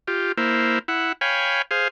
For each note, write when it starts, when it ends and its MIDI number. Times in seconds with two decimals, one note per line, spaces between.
0.07 0.32 65
0.07 0.32 67
0.37 0.79 58
0.37 0.79 64
0.37 0.79 72
0.88 1.12 64
0.88 1.12 78
1.21 1.62 73
1.21 1.62 77
1.21 1.62 79
1.21 1.62 80
1.21 1.62 83
1.71 1.88 68
1.71 1.88 72
1.71 1.88 77